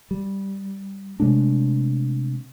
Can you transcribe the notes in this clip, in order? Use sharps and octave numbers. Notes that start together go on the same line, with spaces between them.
G3
C3 G#3 A3 D4